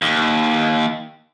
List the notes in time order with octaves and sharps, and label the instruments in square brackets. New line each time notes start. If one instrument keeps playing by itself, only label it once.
[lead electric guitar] D#2